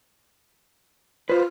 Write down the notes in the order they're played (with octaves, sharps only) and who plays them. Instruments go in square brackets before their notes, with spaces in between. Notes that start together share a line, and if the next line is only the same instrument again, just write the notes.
[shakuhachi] F4 [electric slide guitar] B4 C5